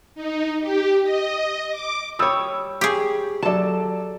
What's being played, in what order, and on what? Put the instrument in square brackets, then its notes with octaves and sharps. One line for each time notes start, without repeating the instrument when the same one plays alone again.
[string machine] D#4
G4
D#5
D6
[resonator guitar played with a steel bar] G3 C#5 [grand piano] D#6 E6
[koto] G4 G#4 [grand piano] C#6
[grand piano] F#3 D5 [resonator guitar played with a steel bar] A4 A5